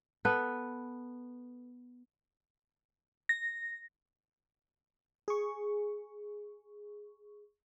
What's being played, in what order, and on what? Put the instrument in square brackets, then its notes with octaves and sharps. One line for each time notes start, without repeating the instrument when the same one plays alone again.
[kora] B3 A4 B4
[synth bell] A#6
[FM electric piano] G#4 C#6